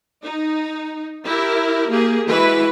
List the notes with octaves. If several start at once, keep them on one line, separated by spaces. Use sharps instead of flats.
D#4
E4 G4 A#4
A#3 G4 G#4
E3 G#3 E4 F#4 B4 B5